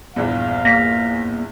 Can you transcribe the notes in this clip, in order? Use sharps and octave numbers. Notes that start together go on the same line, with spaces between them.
A#1 E2 G2 F5
A#3 A#6 B6